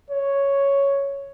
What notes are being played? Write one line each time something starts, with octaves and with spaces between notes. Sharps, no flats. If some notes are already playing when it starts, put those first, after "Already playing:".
C#5